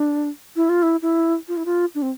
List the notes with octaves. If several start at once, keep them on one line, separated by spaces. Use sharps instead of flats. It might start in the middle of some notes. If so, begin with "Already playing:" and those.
Already playing: D4
E4
F4
E4
E4
F4
E4
F4
D4
C4